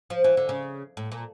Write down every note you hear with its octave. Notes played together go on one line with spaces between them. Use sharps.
F3
E3
D3
C#3
A2
A#2